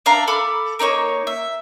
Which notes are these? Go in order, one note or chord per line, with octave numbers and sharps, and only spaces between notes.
D4 E5 F5 A#5
A4 B5 D6 F6
A#3 D#4 C#5 C#6
E5